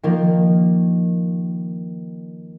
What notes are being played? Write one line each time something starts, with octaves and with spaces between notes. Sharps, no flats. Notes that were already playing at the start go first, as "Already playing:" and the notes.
D#3 F3 A#3